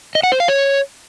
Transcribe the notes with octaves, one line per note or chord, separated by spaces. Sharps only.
D#5
F#5
C5
F5
C#5